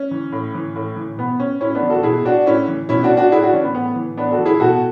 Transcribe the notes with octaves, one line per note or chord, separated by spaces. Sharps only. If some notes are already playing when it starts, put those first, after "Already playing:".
Already playing: C#4
E3
A2
E3
A2
E3
B2 B3
C#4
A2 C#4 E4
B3 D4
E3
F#4 A4
B2 E4 G#4
D4 F#4
A2 C#4 E4
E3
B2 C#4 E4
D4 F#4
D4 F#4
A2 E4 G#4
D4 F#4
E3 C#4
B3
A2 B3
E3
A2 B3 D4
F#4 A4
E3
E4 G#4
B2 F#4 A4